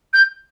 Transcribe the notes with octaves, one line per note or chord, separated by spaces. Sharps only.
G6